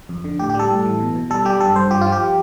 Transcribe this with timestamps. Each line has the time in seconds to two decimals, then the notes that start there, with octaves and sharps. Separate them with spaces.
0.09 F2
0.24 D3
0.39 A2 G4
0.50 G4
0.55 G3 A4
0.70 A2
0.85 E3
1.00 B2
1.15 B2
1.30 G3 A4
1.45 G3 G4
1.60 G2 A4
1.76 G2 C5
1.91 F3 G4
2.01 F4
2.06 F3
2.12 G4